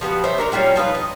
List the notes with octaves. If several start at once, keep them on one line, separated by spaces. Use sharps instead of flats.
F3 G3 B3 F#4
C5 C#5 E5
D4 A#4 C#5
F#3 G3 C#4 F4
F3 D#4 F4 B4
D#5